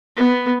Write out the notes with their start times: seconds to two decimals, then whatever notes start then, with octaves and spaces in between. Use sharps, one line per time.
0.17 B3